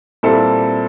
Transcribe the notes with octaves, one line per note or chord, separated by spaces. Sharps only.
A#2 G3 C4 E4 A4